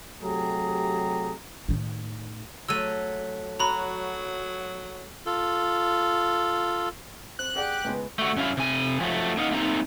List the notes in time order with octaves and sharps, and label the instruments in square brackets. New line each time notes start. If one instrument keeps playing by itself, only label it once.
[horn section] C3 F#3 A3 G4 G#4 A#5
[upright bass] A2 D#3
[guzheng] F#3 A3 [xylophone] E6 D#7
[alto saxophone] F#3 [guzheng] F#4 [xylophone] A#5 B5
[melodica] F4 A4
[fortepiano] C4 [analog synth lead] F#6
[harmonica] G4 [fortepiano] G#4 D5 F#5
[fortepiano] C#2 G#3 B3
[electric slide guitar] A3 F#4
F#2 C#4 E4 F5
C3 G#5
F3 F#3 A3
A#3 D#4 F5 F#5
A3 A#3 C4 D#4 A#5